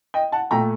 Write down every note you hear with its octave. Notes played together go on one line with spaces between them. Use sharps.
D#5 G5
F#5 A5
A#2 A3 G5 A#5